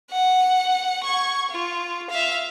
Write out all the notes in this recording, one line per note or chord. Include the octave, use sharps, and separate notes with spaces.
F#5
C#6 G#6
F4
E5 F5